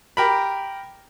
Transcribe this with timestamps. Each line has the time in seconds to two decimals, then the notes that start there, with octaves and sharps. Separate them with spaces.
0.17 G4 A#4 B5